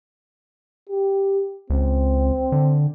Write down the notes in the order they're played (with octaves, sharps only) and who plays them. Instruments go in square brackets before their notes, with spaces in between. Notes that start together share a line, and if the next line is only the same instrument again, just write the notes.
[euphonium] G4
[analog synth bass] C#2 [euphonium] C4
[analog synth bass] D3